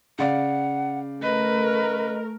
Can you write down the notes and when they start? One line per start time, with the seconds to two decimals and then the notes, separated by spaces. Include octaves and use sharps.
0.19 C#3 D5 F5 F#5
1.22 A3 A#4 B4 D#5